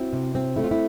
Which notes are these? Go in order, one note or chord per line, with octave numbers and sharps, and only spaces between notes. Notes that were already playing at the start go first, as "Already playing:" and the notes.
Already playing: C4 E4 F#4
C3
C4
A3 E4
F4
E4